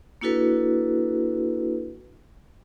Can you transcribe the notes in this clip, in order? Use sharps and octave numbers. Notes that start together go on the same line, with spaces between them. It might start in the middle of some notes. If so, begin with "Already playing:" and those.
A#3 D4 E4 F#4 A4 B4